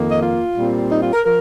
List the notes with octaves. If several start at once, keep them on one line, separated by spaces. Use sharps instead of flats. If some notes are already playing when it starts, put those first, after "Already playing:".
Already playing: F2 D#3 A#3
D#5
F4
A#2 G3 C4
D#4
F4
A#4
F3 A#4